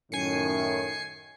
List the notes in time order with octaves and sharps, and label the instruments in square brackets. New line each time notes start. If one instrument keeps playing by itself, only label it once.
[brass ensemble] F#2 A2 D#3 [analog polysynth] G#5 C7 C#7